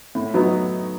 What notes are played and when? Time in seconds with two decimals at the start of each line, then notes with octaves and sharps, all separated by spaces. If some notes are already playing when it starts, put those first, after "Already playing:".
0.15 A2
0.34 F#3 B3 D#4